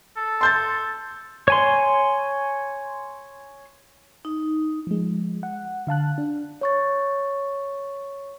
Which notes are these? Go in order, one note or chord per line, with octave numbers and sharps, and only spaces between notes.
A4
C6 G6 A6
C#5 G#5 C6
D#4
F3 G#3
F#5
D3 F5 A5 F#6
D4
C#5 C#6 A6